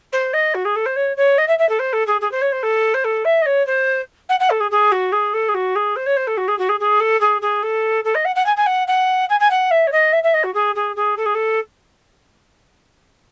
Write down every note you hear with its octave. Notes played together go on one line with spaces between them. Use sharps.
C5
D#5
F#4
G#4
A4
C5
C#5
C#5
D#5
E5
E5
A4
C5
A4
G#4
G#4
C5
C#5
C5
A4
C5
A4
E5
D#5
C#5
C5
F#5
F#5
A4
G#4
G#4
F#4
G#4
A4
G#4
F#4
G#4
C5
C#5
C5
A4
F#4
G#4
F#4
G#4
G#4
A4
G#4
G#4
A4
A4
D#5
F#5
F#5
G#5
G#5
F#5
F#5
G#5
G#5
F#5
E5
C#5
D#5
E5
E5
D#5
F#4
G#4
G#4
G#4
A4
G#4
A4